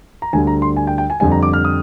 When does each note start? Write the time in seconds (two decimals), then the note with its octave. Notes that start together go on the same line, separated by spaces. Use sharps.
0.22 A#5
0.33 D2 D3 G3 G#5
0.47 A#5
0.62 C6
0.77 G#5
0.87 G5
0.98 G5
1.10 G#5
1.20 F2 D3 G3 G#5
1.32 A#5
1.43 D6
1.53 F6
1.65 D#6